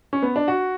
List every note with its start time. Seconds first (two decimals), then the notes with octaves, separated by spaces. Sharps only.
0.13 C#4
0.23 B3
0.36 D4
0.48 F#4